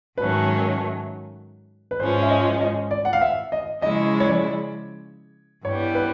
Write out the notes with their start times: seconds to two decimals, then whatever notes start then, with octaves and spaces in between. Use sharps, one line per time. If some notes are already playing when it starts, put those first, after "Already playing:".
0.18 G#2 D#3 F#3 A3 C#4 B4
1.91 B4
2.00 G#2 F3 G#3 C#4 C5
2.22 E5
2.30 D#5
2.61 D#5
2.91 D5
3.05 F#5
3.13 F5
3.21 E5
3.52 D#5
3.82 C#3 F3 G#3 C#4 E4 D#5
4.20 C#5
4.28 D5
5.64 G2 E3 G3 B3 C#5
5.95 B4